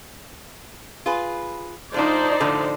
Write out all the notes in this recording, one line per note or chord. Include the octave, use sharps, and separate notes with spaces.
F4 G#4 B4
A2 F3 D4 D#4 C5 D5
A2 D3 F3